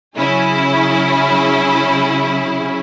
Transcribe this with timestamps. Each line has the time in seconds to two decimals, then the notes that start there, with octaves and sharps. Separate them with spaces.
0.18 C#3 F#3 C#4 E4 G#4